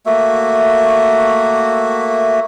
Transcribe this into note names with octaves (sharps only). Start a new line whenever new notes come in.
A3 A#3 F#4 E5